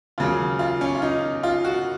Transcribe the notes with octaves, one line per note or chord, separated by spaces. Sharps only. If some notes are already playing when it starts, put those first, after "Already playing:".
D#2 C#3 F#3 F4
F4
C#4
F4
D#4
F4
F#4